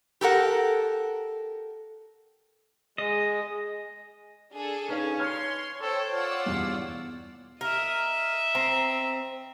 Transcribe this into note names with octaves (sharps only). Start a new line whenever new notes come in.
G4 A4 A#4 F#5
G#3 D#5
D4 G#4 A4
C#4 D#4 B4 F5
C#5 C6 F6 G#6 C#7
A4 C5 C#5 G5
F4 D5 F#5 E6
E2 G2 B2
A#4 D#5 E5
C4 A#5